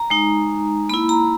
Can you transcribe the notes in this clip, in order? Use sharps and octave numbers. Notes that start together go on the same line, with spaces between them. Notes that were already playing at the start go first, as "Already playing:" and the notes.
Already playing: A#5
G#3 D#4
A#3 E4 B5
A#5